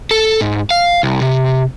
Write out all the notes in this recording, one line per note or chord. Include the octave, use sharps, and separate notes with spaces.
A4
G#2
F5
C2
C3